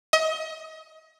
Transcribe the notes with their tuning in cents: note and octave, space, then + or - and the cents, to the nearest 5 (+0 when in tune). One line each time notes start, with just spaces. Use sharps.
D#5 +35